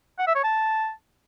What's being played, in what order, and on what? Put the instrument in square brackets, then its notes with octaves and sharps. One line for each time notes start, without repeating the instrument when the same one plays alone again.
[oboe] F#5
E5
C#5
A5